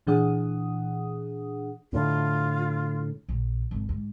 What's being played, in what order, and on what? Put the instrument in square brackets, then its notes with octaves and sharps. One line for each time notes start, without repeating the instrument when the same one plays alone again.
[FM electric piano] A#2 E3 D4 G#4 F#5 D#6
[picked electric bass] A2 D3 [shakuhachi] F4
[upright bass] A#1
G#1
G#2